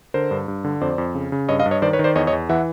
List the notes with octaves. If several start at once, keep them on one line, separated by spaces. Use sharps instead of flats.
D3 A#4 C5
G2
G2
D3
F2 C5 D5
F2
C#3
C#3
G2 C#5 D#5
D#5 F5
G2
C#5 D#5
D#3 C5 D5
B4 C#5
D#3
C5 D5
E2 C#5 D#5
C#5 D#5
E2
E3 E5 F#5